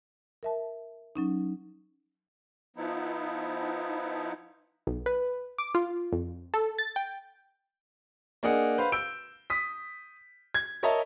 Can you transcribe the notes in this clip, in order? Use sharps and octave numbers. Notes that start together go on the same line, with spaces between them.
A#4 E5 A5
F#3 C#4 D#4
F3 B3 D#4 E4
B1
B4
D6
F4
F2
A4
A6
G5
A#3 D4 G#4 D#5 F#5
B4 C5 F5
E6 G6 D7
D#6 B6
G#6
A#4 C#5 D#5 E5 A5 A#5